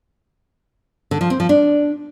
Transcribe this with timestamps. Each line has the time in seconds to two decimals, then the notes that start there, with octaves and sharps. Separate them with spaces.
1.11 D3
1.21 F3
1.30 C4
1.40 F3
1.49 D4